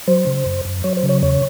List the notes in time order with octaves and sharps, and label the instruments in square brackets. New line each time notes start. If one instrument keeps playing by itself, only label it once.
[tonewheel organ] F#3 C5
C#3
F#2
F#2
F#3 C#5
C5
C#3
C#5
E2 C#5